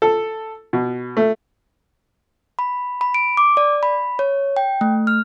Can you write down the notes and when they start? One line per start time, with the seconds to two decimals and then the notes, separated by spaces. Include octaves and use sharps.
0.02 A4
0.73 B2
1.17 A3
2.59 B5
3.01 B5
3.14 D7
3.37 D6
3.57 D5
3.83 B5
4.19 C#5
4.56 G5
4.81 A3
5.07 F6